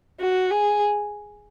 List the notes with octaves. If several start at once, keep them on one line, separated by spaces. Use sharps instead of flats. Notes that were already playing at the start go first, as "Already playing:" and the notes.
F#4
G#4